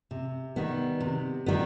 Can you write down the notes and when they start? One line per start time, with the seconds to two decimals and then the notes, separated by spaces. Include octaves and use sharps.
0.11 C3
0.56 D#3 G3 B3
1.00 C3
1.46 D#3 G3 B3